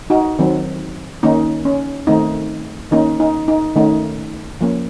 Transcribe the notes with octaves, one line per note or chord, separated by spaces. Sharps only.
D#4 F#4
D#3 F#3 C4
D#3 A#3 C#4 D#4
C#4
D#3 A3 C4 D#4
D#3 A#3 C#4 D#4
D#4
D#4
D#3 A3 C#4 D#4
F3 A#3 C#4